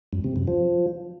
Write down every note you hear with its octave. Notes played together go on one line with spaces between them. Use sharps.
F#2
C3
F#2
F3